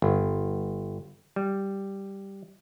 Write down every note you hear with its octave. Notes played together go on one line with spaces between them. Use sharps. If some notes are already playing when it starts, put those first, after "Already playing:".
G1
G3